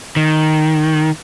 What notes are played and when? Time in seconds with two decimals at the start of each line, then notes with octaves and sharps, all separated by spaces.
0.16 D#3